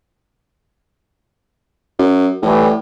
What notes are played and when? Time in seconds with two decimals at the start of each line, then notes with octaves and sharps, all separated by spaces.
1.99 F#2
2.42 A2 E3 G3 A3